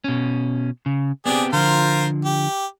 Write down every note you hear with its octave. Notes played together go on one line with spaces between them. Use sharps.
B2 C#4
C#3
B3 C4 D4 G4 G#4
D3 F3 F4 A#4 C5
G4